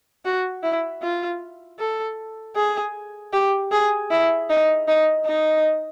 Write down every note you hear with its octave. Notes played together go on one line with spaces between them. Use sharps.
F#4
E4
F4
A4
G#4
G4
G#4
E4
D#4
D#4
D#4